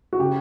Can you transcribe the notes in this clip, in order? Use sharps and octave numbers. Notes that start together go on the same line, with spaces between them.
F#4
C#3 G4